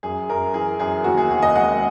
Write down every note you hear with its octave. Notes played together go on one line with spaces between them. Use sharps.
F#2 G#4
F#2 A#4
E3 G#4
F#2 G#4
D#2 F#4
G#4
D#2 G#4
D#5
G#3 F#5